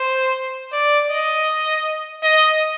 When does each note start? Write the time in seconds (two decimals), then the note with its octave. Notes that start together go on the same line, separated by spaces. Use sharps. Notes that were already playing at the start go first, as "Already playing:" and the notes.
Already playing: C5
0.72 D5
1.11 D#5
2.23 D#5